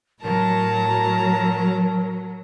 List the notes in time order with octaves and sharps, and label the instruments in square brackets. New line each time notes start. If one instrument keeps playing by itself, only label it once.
[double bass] A2 [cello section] F#3 [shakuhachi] A#4 [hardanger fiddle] A5 A#5